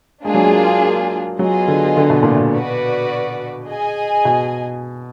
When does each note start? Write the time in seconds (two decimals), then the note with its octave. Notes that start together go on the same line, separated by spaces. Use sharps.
0.25 G#3 A#3 D4 F4 G#4
0.34 F#3
0.44 G#3
1.39 F#3 B3 F4 G#4 D#5
1.68 D3
1.97 D3
2.10 B2
2.23 A#2
2.36 B2
2.54 F#4 B4 D5
3.68 G#4 D#5 G#5
4.25 B2